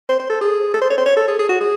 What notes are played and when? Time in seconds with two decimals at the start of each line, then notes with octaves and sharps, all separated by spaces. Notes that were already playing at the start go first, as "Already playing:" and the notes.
0.09 C5
0.19 C5
0.30 A4
0.41 G#4
0.74 A4
0.81 C5
0.90 C#5
0.98 C5
1.06 C#5
1.16 A4
1.28 G#4
1.39 G#4
1.49 F#4
1.61 G#4